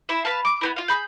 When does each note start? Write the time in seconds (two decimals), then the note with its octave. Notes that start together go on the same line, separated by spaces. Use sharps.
0.09 E4 E5
0.25 B4 F5 A5
0.45 D6
0.61 B3 C4 E4
0.76 F4 F5
0.88 G#4 B5 G6